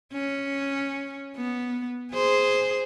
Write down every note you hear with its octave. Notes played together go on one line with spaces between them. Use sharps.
C#4
B3
G#4 C5